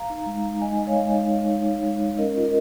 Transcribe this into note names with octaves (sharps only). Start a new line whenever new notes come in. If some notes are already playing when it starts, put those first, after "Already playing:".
Already playing: F5 A#5
D#4
G#3
D#4
G#3 D#5 G#5
G#3 D#5
C#5 F5
G#3
D#4
D#4
D#4
D#4
G#3
G#3
C#4 A#4 D#5
F4
A#4 D#5